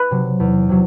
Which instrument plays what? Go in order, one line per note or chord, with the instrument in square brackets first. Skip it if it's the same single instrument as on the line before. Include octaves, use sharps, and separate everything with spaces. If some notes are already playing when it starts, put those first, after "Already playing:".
Already playing: [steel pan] B4
[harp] C3 F#3
E2
C3 F#3